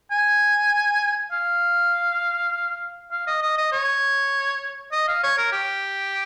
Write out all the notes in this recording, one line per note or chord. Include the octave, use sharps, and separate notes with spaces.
G#5
F5
F5
D#5
D#5
D#5
C#5
D#5
F5
C#5
A#4
G4